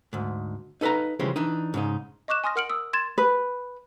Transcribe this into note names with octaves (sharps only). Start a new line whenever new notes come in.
D2 G#2
D#4 A4 B4 F5 A#5
C#3 E3 F3 G3 G#3
E3 D4 D#4
G#2 C#3 D#4
D#5 C#6 D6 F#6 E7
G#5 C6 D#6 F6 A#6
A#4 F#5 F6 C#7 D7 F#7
D#6 E6
C6 G#6 A6 E7
B4